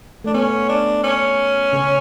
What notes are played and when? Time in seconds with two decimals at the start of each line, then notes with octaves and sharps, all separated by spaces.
0.24 A3 D4
0.34 B3 C#4
0.69 D4
1.03 C#4
1.73 C#3